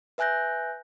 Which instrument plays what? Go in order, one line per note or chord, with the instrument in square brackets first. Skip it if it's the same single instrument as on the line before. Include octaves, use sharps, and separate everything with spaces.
[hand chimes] B4 E5 G#5 F#6 G6 A#6